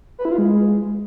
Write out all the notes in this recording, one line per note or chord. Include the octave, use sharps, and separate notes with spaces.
B4
E4
F4
G#3